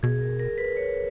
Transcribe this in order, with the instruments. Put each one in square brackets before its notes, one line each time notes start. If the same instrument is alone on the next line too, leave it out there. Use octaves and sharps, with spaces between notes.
[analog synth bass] B2 [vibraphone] G#4
[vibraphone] A#4
A#4
B4
C#5